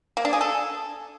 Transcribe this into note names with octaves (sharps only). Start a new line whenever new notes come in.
A#3
D4
G#4
A4